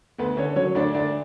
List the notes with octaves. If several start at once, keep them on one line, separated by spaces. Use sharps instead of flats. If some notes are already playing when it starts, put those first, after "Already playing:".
D2 B3 B4
D3 C#4 C#5
F#3 C#4 C#5
D2 D4 D5
D2 D4 D5